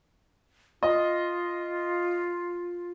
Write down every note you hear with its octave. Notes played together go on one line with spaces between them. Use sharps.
F4 D#5